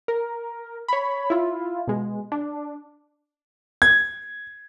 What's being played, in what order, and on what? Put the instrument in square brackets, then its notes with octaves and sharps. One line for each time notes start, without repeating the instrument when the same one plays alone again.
[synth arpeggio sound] A#4
C#5 B5
E4 F4
B2 G#3
D4
[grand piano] G#6